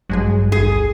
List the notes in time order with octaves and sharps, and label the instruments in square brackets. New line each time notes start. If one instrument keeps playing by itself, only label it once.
[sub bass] A1 [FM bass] G2 [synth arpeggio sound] F#3 G#3 G#4
[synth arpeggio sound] G#1 [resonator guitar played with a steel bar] G#4
[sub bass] D2